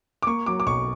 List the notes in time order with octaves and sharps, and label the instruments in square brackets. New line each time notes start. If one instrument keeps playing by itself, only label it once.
[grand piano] D6
A#3 C#6
F#3 D6
D6
B1 C#6